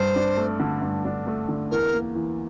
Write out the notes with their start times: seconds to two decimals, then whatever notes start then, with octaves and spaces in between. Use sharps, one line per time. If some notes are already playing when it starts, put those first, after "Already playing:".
Already playing: G2 C5
0.16 D4
0.37 A3
0.59 D3
0.81 G2
1.05 D4
1.27 A3
1.49 D3
1.71 E2 A#4
1.94 A#3
2.15 E3